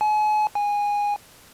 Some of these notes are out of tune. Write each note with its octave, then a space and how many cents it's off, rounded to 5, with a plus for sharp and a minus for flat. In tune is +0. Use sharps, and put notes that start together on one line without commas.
G#5 +40
G#5 -15